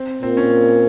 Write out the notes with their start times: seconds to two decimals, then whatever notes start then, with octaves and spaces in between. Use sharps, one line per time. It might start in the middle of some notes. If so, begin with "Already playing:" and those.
Already playing: C4
0.22 A#2 C4
0.37 C#4